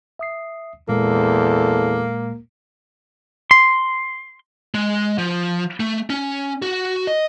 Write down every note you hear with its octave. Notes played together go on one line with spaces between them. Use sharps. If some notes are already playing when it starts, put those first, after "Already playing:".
E5 D#6 C7
E2 A#2 G#3 A#3 A4
C6
G#3
F3
A3
C#4
F#4
D#5